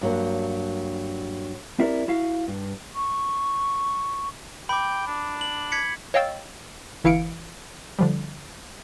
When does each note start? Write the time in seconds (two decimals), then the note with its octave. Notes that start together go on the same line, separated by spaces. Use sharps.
0.01 G2 F#3 A#3 D4
1.79 C4 E4 G4 A#4 C#5 D5
2.08 E4 F#4 F5
2.48 G2
2.95 C#6
4.69 G5 B5 D6
5.07 D4
5.41 F#7
5.72 G#6 B6 C#7
6.14 C#5 D#5 F5 G5 E6 A6
7.04 G1 E3 E4 F5 C#7 D7
7.99 D3 F3 G3